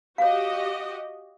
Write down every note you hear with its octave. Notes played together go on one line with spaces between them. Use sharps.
F#4 G4 C#5 D#5 F5